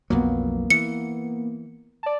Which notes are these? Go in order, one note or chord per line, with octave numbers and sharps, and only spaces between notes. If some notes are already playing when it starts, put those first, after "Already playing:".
B1 F2 F#3 A#3 B3
E3 C#7
D5 A5